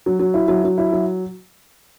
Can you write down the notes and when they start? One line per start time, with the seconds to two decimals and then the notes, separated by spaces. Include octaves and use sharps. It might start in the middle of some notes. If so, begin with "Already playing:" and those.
0.06 F#3
0.19 F#3
0.34 E4
0.48 F#3
0.64 F#3
0.78 E4
0.92 F#3